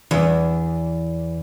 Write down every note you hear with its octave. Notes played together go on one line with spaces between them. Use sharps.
E2